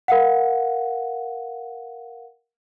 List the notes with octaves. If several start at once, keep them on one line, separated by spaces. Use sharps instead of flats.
A#4 F5 F#5